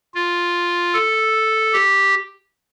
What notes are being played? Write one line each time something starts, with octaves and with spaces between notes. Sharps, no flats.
F4
A4
G4